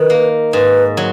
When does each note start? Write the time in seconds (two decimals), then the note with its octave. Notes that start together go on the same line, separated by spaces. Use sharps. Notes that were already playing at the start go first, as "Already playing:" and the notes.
Already playing: D#3 B4
0.10 A#3
0.53 G#2 B4
0.97 F#3